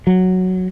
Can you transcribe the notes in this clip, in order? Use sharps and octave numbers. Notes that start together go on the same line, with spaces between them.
F#3